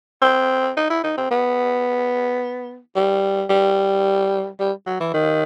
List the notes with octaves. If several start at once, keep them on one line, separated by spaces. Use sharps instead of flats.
C4
D#4
E4
D#4
C4
B3
G3
G3
G3
F#3
E3
D#3